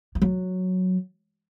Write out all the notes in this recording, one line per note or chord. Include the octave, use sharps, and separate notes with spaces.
E3
F#3